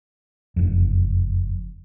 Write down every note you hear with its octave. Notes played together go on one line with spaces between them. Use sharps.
F#1 F2